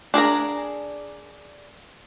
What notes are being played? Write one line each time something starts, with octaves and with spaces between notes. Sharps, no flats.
D4 G#4 A#4 A#5